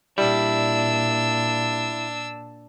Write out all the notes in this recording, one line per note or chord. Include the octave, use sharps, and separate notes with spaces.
A#2 G3 D4 E4 E6